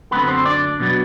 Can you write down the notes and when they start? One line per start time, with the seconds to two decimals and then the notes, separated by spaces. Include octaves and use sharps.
0.11 F#2 D3 A3 B3 C4 B4
0.28 C4 C5
0.45 D4 D5
0.80 B2 F#3 B3